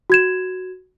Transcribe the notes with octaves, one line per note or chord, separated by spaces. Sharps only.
F#4 G#6 E7